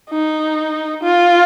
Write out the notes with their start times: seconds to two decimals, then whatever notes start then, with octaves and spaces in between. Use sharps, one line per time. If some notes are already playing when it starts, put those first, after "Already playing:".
0.10 D#4
1.03 F4